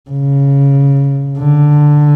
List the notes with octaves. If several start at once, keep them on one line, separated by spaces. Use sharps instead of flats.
C#3
D3